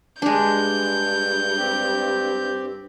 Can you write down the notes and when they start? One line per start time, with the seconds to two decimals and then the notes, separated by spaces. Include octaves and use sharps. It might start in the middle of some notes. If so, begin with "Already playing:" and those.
0.22 G2 G#3 D4 G6
1.58 C4 G4